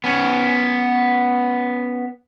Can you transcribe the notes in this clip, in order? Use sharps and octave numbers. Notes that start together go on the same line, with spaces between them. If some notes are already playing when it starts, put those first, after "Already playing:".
B3 C#4